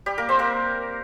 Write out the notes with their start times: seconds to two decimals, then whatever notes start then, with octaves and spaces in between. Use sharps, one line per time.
0.06 G3 G4
0.18 A#3 A#4
0.29 C4 C5
0.39 A#3 A#4